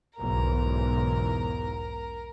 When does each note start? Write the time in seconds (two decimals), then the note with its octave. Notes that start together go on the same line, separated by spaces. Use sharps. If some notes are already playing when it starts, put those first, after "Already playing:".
0.17 B1 E2 G#2 A#4